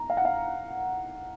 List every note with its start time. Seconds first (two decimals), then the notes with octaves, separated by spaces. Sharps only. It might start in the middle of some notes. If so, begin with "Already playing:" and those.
Already playing: A#5
0.10 F5
0.17 F#5
0.25 F5